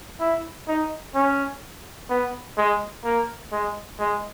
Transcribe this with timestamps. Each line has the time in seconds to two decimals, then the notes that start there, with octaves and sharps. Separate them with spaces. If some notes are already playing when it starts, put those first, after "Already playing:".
0.20 E4
0.67 D#4
1.15 C#4
2.10 B3
2.58 G#3
3.05 A#3
3.52 G#3
3.99 G#3